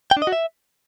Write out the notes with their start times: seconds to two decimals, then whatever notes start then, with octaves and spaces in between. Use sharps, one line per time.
0.11 G5
0.17 D4
0.22 D#5
0.27 F#4
0.32 E5